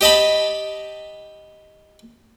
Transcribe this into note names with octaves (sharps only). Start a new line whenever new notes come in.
G4 D#5 A5 B5